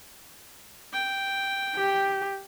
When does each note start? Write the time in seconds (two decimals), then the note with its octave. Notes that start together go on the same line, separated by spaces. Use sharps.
0.93 G5
1.76 G4